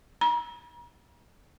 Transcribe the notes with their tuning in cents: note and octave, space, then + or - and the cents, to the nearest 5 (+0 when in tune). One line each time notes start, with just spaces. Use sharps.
A#5 +35